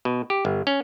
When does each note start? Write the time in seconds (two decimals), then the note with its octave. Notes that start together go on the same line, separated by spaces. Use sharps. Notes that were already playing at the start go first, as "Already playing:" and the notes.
0.05 B2
0.30 G4
0.45 G1
0.67 C#4